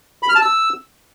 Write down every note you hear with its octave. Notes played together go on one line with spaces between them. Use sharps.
B5
F6
A5
E6